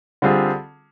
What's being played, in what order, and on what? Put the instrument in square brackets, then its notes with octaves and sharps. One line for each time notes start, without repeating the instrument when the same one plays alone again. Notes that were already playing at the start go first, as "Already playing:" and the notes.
[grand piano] D3 G3 C4 F4 G#4